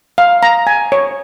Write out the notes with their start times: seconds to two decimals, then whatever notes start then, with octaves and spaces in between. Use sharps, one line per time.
0.18 F5
0.43 A#5
0.67 G#5
0.92 C#5